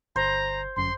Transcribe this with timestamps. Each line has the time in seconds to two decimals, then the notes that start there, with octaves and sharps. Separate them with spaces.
0.16 G1 C5 A#5
0.76 G1 F#2 C6